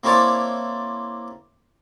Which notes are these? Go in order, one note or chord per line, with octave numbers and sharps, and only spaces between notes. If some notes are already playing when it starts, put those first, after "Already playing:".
A#3 C4 E4 C#5 D5 A5